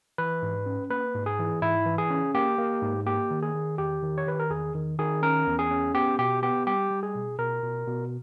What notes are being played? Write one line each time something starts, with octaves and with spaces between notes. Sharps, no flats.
E3 B4
G#2
C#4
A#3 B4
G#2
G#4
E3
G#2 E4
E3
G#4
C#4
A#3 G4
A#3
G#2
A#3 G4
D#3
G#4
D#3
E2 G4
D#3
C#5
D#3 B4
A#4
E2 G#4
D#3
D#3 G#4
C#4 A#4
E2
G#4
C#4
B3 G4
B2 G4
B3 G4
G3 G4
G3
G#4
B2
B2 A#4
B2
B2